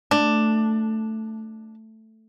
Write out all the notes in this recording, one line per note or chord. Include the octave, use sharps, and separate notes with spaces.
A3 D4